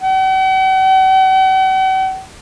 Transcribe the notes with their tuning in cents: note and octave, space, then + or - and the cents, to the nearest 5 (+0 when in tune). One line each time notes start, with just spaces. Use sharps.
F#5 +45